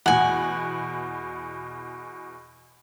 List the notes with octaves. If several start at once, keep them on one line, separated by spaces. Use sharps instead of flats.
E2 B2 F#5 G#5